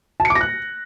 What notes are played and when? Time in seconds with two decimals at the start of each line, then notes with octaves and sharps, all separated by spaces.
0.20 A5
0.25 C#7
0.30 D6
0.35 A#6
0.41 F#6